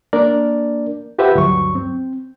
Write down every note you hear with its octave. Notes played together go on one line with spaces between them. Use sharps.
A#3 D4 A#4 D5
F4 G4 B4 C5 E5 F#5
D2 G2 F#3 C#6
C4